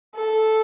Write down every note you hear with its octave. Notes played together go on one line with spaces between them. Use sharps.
A4